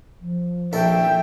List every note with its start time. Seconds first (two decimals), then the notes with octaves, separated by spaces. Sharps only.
0.21 F3
0.73 A#1 A4 E5 G5